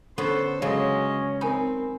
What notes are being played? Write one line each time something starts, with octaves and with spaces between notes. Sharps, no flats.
D3 B3 C#4 A4 C5
C#3 F#3 G#3 C#4 D#5
C4 D#4 A#4 G#5 B5